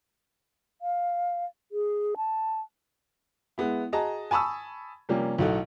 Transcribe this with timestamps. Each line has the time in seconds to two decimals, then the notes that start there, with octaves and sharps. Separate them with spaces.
0.82 F5
1.72 G#4
2.17 A5
3.58 G#3 B3 E4
3.92 F#4 G#4 D#5 A5 A#5
4.31 G#5 A5 B5 C#6 D#6 E6
5.09 C3 F3 G3 A#3 C#4
5.38 B1 A2 D#4 F#4 A4